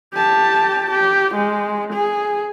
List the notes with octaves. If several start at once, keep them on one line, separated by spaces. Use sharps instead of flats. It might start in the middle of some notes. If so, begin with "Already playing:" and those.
G4 A5
G4
G#3
G#4